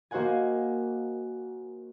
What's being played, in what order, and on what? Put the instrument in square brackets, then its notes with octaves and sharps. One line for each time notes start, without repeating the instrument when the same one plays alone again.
[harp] A#3 F#4 C5 D#5 F#5 G#5